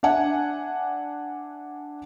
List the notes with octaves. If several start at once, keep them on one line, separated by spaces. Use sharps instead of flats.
D4 E5 F#5 G#5